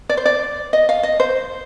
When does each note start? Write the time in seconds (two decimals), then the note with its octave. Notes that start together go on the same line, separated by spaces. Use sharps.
0.09 D5
0.17 C5
0.26 D5
0.73 D#5
0.89 F5
1.03 D#5
1.20 C5